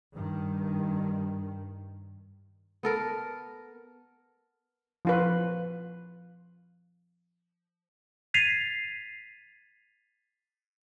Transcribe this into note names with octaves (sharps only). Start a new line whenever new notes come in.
G2 D#3
B3 A4 A#4
F3 F4 B4
G#6 A6 B6 C7 D#7 F7